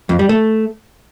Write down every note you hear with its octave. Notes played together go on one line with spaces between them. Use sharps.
F2
G3
A3